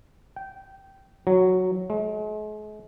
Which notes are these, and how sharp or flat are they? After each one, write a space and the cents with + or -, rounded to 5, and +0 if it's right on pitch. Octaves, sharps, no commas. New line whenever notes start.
G5 -15
F#3 +0
G#3 +40